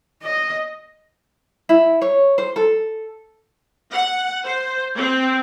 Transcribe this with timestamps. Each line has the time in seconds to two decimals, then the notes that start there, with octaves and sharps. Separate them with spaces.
0.23 D#5
1.69 E4
2.02 C#5
2.38 C5
2.56 A4
3.92 F#5
4.44 C5
4.96 C4